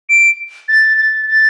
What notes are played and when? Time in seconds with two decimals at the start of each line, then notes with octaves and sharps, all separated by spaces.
0.09 D7
0.68 A6
0.97 A6
1.27 A6